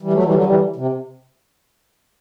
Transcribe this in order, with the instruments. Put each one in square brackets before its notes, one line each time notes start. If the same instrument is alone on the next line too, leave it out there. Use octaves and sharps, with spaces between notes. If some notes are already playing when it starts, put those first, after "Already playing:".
[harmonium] E3 G3
F#3 A3
E3 G3
D3 F#3
E3 G3
C3